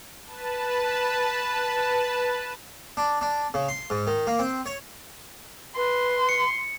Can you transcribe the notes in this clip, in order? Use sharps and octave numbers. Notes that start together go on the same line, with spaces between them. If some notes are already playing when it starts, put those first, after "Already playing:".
B4 A5
D4
D4
C#3
C6
G#2
D#3
A#3
C4
C#5
B4 C6
C#7